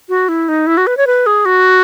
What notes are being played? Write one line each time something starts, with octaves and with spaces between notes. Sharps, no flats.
F#4
E4
D#4
E4
F#4
B4
C#5
B4
G#4
F#4